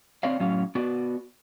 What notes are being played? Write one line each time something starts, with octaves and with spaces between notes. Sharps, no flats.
C4 C#5 D5 F5
A2 F#3 C#4 F5
B3 F#4 D5